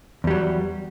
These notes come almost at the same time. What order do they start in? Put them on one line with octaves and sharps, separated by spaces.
E2 G3 F#3